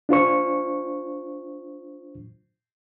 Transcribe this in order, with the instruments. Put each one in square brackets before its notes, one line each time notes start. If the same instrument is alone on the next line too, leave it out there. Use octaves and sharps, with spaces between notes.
[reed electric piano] D4 F4 C5 C#6